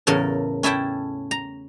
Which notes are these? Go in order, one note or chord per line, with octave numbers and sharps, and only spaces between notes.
E2 A2 C#3 A4 A#4
C#4 E4 A4 E5 G5
A#5